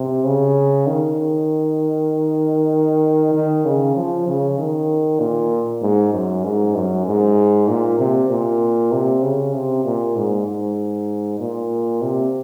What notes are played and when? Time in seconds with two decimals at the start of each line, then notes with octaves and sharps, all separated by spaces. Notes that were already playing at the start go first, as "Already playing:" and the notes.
Already playing: C3
0.24 C#3
0.87 D#3
3.34 D#3
3.65 C#3
3.96 F3
4.27 C#3
4.58 D#3
5.20 A#2
5.82 G#2
6.13 F#2
6.44 G#2
6.75 F#2
7.06 G#2
7.68 A#2
7.99 C3
8.29 A#2
8.92 C3
9.22 C#3
9.53 C3
9.84 A#2
10.16 G#2
10.46 G#2
11.40 A#2
12.01 C3